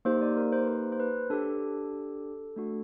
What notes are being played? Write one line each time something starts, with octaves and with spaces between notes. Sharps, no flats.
A#3 D#4 G4 C5
D5
A#4
C5
B4
C5
C5
B4
D4 G4 A4
A3 D4 F#4